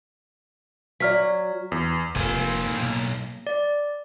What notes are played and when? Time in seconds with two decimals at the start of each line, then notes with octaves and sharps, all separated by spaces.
1.00 F#3 D5 F6 B6
1.72 E2
2.15 F1 D#3 A#3 C4 G#5
2.67 A2
2.79 B1
3.47 D5